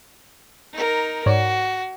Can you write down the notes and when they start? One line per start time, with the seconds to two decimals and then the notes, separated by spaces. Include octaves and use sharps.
0.73 D#4 A#4
1.26 G#2 F#4 C#5 D5